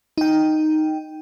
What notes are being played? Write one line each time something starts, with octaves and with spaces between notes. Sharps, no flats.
D#4 G5